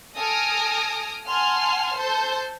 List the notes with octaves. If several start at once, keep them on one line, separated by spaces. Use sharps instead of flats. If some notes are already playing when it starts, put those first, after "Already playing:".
A4 G#5 D#6 F6 A#6 D7
F#5 G#5 A5 C6 F6
A4 C5 A5 G6